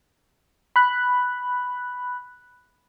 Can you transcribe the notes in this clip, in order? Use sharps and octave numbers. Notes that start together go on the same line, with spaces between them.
B5 F#6